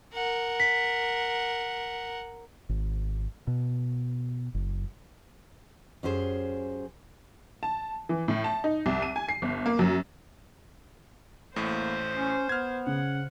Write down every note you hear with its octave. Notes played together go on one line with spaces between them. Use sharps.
A#4 F#5
B6
G#1
B2
F#1
F#2 C#4 G4 G#4 C5
A5
E3
A2
A5
D#4
C2
D#7
G#5
C7
G1
A#3
F#2
A1 A2 A#3 C5
C#4
B3 F6 G#6
C#3 F#5